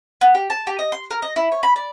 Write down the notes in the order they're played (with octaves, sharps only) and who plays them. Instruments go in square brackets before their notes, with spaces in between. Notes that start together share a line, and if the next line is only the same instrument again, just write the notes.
[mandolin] B3
G4
A5
G4
D#5
C6
A#4
D#5
E4
C#5
B5
D5